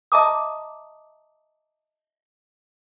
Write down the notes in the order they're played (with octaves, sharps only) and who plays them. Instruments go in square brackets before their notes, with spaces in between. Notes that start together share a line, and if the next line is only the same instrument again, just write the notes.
[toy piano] D#5 E5 A5 A#5 D6 D#6